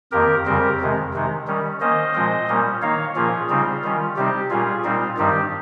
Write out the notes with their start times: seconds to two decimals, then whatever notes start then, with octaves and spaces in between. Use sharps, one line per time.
0.12 F2 D#3 A#3 G4 A#4
0.45 F2 C#3 G3 C4 G4 A#4
0.80 F2 C3 D#3 G#3
1.14 C3 D#3 G#3 D#4
1.47 D#3 G3 C#4
1.81 D#3 A#3 C#4 C5 D#5
2.14 A#2 F3 G#3 C4
2.48 A#2 G3 A#3 C#4
2.82 D#3 A#3 D#4 C#5 F5
3.16 A#2 F3 A#3 C#4 F4 G#4
3.49 C#3 G3 C4 D#4 F4
3.84 D#3 G3 C#4
4.16 C3 G3 C4 D#4 G4
4.50 A#2 G3 C#4 F4 G#4
4.84 A#2 G3 C4 D#4 F4
5.18 G2 D#3 G3 C4 D#4 G4